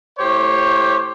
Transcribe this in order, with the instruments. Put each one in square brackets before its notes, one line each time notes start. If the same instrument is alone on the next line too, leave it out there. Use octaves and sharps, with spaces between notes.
[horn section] A2 G4 C5 C#5